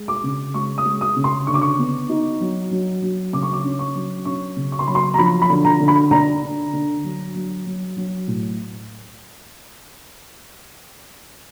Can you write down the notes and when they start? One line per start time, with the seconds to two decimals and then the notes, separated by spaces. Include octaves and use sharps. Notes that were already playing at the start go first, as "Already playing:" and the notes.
Already playing: G#3
0.08 D6
0.24 C#3
0.54 G#3 C#6
0.78 D#6
0.85 G#3
1.01 D#6
1.16 C#3
1.24 C6
1.47 D3 C#6
1.54 D6
1.62 C#6
1.78 B3
2.09 D#4
2.40 F#3
2.71 F#3
3.02 F#3
3.33 C#3 D6
3.43 C#6
3.53 D6
3.64 C#4
3.79 C#6
3.95 F#3
4.25 C#4 C#6
4.56 C#3
4.72 C#6
4.79 C6
4.87 F#3 B5
4.95 C6
5.14 A#5
5.18 F3 B5
5.42 B5
5.49 D3
5.65 A#5
5.80 D3
5.88 B5
6.11 D4 A#5
6.42 D3
6.73 D3
7.04 F#3
7.35 F#3
7.66 F#3
7.97 F#3
8.28 A2